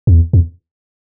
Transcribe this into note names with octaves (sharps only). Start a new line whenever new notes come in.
E2
E2